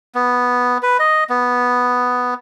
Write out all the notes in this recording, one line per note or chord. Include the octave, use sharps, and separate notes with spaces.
B3
B4
D#5
B3